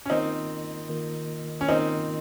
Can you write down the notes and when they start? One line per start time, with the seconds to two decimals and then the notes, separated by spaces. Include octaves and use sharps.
0.06 C#4
0.10 D#3 A#3 C4 D#4 F4 A#4
0.89 D#3 A#3 F4 A#4
1.61 C#4
1.68 D#3 A#3 C4 D#4 F4 A#4